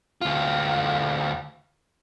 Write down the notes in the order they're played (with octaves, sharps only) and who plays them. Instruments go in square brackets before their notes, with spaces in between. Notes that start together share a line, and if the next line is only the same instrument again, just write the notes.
[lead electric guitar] D2 F4